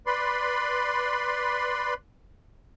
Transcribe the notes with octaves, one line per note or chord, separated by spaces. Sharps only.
B4 D5 B5 C6